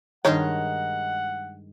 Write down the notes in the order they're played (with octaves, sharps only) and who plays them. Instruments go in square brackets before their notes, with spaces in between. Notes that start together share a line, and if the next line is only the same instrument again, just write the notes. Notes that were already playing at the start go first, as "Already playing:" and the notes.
[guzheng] G2 D#3 G#3 [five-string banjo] D#4 C#5 [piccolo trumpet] F#5